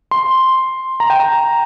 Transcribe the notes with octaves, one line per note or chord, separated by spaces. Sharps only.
C6
A#5
G5
A#5